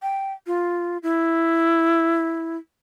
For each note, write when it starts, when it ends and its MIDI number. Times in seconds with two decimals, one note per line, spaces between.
0.02 0.33 79
0.47 0.98 65
1.03 2.57 64